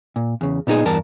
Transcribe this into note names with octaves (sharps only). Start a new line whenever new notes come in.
A#2
E2 C#3
A#2 B3 D#4 G#4
E2 G2 A#4 A5